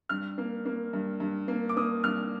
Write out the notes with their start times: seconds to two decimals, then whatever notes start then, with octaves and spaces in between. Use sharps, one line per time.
0.09 G2 F6
0.38 A#3
0.65 A#3
0.93 G2
1.20 G2
1.48 A#3
1.69 D6
1.77 A#3 D#6
2.04 G2 F6